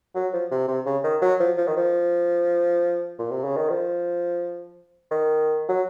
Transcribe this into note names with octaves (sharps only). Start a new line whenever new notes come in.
F#3
F3
C3
C3
C#3
D#3
F#3
F3
F3
D#3
F3
A#2
C3
C#3
D#3
F3
D#3
F#3